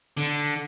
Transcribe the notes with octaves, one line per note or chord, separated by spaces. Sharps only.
D3